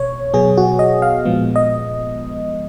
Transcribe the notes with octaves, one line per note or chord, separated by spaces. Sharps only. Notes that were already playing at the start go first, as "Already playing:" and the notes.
Already playing: B2 C#5
B2 F#3 B3 G#4
F#4
D#5
F5
A#2 F3 G#3 B3
D#5